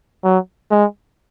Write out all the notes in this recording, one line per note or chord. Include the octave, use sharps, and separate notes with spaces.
F#3
G#3